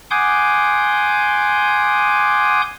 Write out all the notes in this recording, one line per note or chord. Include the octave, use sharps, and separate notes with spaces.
F#5 G#5 C6 D6 D#6 G6